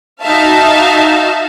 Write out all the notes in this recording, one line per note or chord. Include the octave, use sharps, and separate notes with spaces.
D#4 F#4 E5 F5 A5